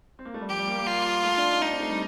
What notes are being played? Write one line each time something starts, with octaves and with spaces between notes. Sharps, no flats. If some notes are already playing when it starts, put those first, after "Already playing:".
C4
A#3
A3
G3
F3 G4
G3
A#3
A#3
F4
A3
D4
D#4
D4 D#4
C4
A3
G3